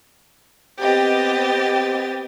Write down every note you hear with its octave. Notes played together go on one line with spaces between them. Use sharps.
B3 C4 G4 D#5 G5 A6